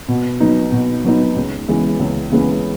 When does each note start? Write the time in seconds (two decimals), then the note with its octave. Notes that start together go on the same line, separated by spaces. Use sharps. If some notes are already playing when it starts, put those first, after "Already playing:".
0.08 B2
0.40 F#3 B3 D#4
0.72 B2
1.04 F#3 B3 D#4
1.36 C#2
1.68 C#3 E3 G#3 B3
1.99 C#2
2.32 C#3 E3 G#3 B3